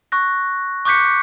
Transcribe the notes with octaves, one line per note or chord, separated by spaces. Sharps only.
C#6 F#6 A#6
C#6 D6 F#6 G6 B6 C#7